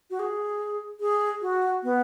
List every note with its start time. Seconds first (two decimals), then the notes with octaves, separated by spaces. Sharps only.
0.11 F#4
0.19 G#4
1.00 G#4
1.42 F#4
1.83 B3